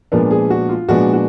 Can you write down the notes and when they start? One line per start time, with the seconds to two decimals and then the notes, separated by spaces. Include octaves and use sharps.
0.12 A#2 F3 G#3 B3 D4 A#4
0.31 G#4
0.50 F#4
0.69 F4
0.88 A#2 F3 G#3 B3 D4 F#4
1.14 F#4